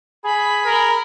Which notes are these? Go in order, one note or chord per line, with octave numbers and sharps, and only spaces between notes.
G#4 B5
A#4